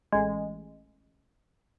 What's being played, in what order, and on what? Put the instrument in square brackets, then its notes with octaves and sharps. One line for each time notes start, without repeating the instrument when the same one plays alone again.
[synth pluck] A1 G#3